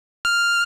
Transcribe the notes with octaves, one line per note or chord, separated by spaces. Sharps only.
F6